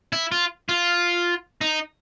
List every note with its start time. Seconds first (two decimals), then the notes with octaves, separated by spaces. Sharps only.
0.13 E4
0.32 F4
0.69 F4
1.61 D#4